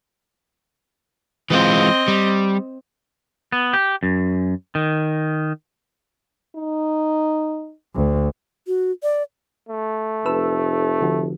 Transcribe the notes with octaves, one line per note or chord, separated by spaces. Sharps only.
E3 G#3 C4 F4 D#5
G3
B3
G4
F#2
D#3
D#4
D2
F#4
D5
A3
F1 A4 B4 E6
D3 F3 F#4